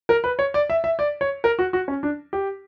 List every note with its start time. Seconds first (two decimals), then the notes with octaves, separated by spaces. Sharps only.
0.09 A#4
0.24 B4
0.39 C#5
0.54 D5
0.70 E5
0.84 E5
0.99 D5
1.21 C#5
1.44 A#4
1.59 F#4
1.73 F#4
1.88 C#4
2.03 D4
2.33 G4